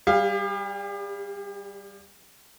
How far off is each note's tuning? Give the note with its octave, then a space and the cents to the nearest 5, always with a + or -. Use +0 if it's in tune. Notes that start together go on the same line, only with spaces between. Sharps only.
G3 +0 G4 +45 F5 +0